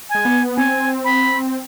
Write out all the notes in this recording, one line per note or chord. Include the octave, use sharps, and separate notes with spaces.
G#5
G#3
B3
C4 G#5
B5